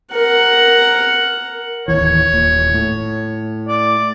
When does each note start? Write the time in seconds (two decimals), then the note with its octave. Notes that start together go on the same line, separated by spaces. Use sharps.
0.14 A#4 F#5
1.88 D1 D#2 E3 C#5
2.33 D#1 A#2
2.74 A2
3.68 D5